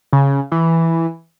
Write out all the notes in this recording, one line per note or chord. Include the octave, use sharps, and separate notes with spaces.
C#3
E3